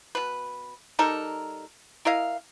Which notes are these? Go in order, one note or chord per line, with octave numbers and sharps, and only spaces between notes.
B2 B4
G3 D#4 A4 A#4
E4 A#4 D#5 F5